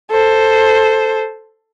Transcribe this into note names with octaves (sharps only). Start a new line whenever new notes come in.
A4 C5